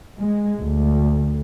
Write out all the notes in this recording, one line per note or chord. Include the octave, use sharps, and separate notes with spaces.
G#3
D2